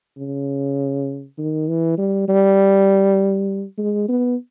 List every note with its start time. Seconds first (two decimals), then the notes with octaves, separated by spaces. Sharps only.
0.18 C#3
1.38 D#3
1.68 E3
1.98 G3
2.28 G3
3.78 G#3
4.09 B3